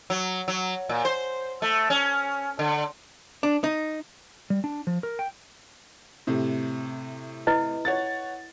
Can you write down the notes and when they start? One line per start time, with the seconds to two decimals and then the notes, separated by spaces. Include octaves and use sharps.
0.10 F#3
0.48 F#3
0.89 A#2
1.05 C5
1.62 A3
1.90 C#4
2.59 D3
3.43 D4
3.64 D#4
4.50 G3
4.64 D4
4.87 F3
5.03 A#4
5.19 G5
6.27 A2 C3
7.47 E4 B4 D#5
7.85 C#5 F#5 A6